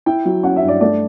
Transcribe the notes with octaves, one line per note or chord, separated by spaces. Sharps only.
E4 G5
F#3
C#4 F#5
E5
G2
D5
A3 D5